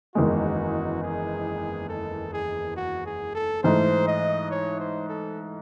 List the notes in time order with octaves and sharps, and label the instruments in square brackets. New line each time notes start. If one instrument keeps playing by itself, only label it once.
[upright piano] F#1 E2 D#3 G#3 [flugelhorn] F#4
[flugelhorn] G#4
A4
G#4
F#4
G#4
A4
[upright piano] G#2 E3 A3 [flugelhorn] C5
[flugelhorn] D#5
C#5
C5
A4